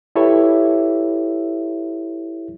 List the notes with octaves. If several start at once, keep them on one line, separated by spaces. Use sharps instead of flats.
E4 G4 A4 B4 C#5 E5